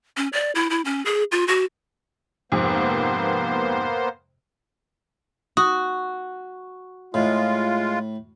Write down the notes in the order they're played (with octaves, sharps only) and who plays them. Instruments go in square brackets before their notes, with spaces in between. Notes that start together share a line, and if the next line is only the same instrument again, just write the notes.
[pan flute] C#4
D5
E4
E4
C#4
G#4
F4
F#4
[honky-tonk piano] F2 G#2 C3 [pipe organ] A#3 B3 C5
[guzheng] F#4 [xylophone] D#6
[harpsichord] A2 [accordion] G#3 F4